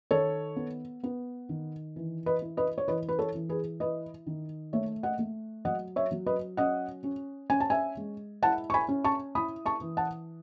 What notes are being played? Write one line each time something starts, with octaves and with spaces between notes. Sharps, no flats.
D#3 A4 C#5
B3
B3
D#3
E3
B4 D#5
E4
B4 D#5
C#5
E3 B4 D#5
B4
A4 C#5
E3
G#4 B4
E4 B4 D#5
D#3
A3 C#5 E5
D#5 F#5
A3
F#3 D#5 F#5
C#5 E5
F#3
B4 D#5
C#4 D#5 F#5
C#4
C#4 G#5
A5
E5 G#5
G#3
E4 F#5 A5
C#6
G#5 B5
C#4
A5 C#6
E4 B5 D#6
A5 C#6
E3
F#5 A5